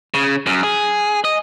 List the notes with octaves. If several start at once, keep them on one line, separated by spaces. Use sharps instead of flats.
C#3
F#2
G#4
D#5